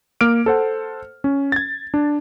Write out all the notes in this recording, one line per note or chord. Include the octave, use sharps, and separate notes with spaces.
A#3 D6 F6 D7
A4 C5 F#5
C#4
G#6 A6
D4